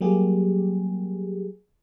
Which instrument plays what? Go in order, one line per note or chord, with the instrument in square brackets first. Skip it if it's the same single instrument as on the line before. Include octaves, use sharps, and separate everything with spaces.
[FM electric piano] F#3 G3 A#3 G4 G#4